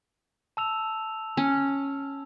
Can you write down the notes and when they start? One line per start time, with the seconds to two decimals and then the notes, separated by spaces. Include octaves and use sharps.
0.57 A5 E6 F7
1.37 C#4